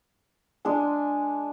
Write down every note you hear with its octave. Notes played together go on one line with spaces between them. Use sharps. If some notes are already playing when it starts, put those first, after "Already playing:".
G#3 D4 G#5